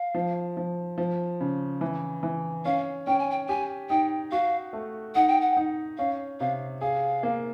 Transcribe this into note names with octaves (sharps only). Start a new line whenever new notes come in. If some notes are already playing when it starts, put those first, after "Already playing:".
Already playing: F5
F3
F3
F3
C#3
E3
E3
C#4 F5
C#4 G5
G#5
G5
G4 G#5
D#4 G5
F#4 F5
A3
D#4 F#5
G5
F#5
D#4
C#4 F5
C3 F5
G#4 F5
A#3